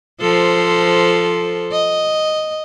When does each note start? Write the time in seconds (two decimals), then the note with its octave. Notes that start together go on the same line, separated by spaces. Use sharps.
0.20 F3 A4 C5
1.72 D#5